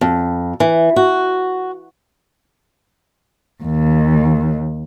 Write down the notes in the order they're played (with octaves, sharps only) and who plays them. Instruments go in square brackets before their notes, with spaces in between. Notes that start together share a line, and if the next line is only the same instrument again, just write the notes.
[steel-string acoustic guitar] F2
E3
F#4
[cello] D#2